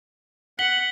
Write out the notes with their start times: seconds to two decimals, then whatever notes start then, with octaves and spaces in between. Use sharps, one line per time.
0.59 F#5 B6 C#7 F#7 G7